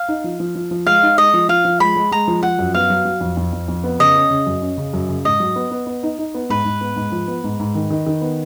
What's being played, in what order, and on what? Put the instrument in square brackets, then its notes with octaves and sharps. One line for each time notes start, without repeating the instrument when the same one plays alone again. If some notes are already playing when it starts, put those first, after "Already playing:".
Already playing: [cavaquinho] F5
[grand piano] D#4
F3
F3
F3
F3
[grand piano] G#3 [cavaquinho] F5
[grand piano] D#4
[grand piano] G#3 [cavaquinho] D#5
[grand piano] F3
[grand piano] F3 [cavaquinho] F5
[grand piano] F3
[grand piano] G#3 [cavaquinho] B5
[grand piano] G#3
[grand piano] G#3 [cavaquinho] A#5
[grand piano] F3
[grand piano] F3 [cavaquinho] F#5
[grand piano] F#2
[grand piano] B3 [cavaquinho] F5
[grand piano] F#3
F#3
F2
F2
F2
F2
B3
[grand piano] C#3 [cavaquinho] D#5
[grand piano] C#4
C#3
F#2
C#4
C#3
F#2
C#3
[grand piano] G#2 [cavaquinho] D#5
[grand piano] F#3
B3
B3
B3
D#4
D#4
B3
[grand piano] G#2 [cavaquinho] B4
[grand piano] G#2
B3
G#2
F3
B3
G#2
G#2
D#3
D#3
D#3
B3